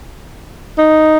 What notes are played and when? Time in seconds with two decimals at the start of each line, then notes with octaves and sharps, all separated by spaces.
0.78 D#4